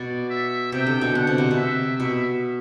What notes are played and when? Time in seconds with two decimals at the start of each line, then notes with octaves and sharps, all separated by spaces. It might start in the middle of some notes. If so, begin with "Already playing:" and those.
Already playing: B2 D5
0.30 E5
0.72 C3 G5
0.87 D3
1.01 B2
1.15 D3 F#5
1.27 C3
1.38 B2
1.51 C3
1.58 E5
2.00 B2